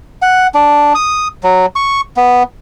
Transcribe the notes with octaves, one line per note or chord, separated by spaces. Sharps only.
F#5
D4
D#6
F#3
C#6
B3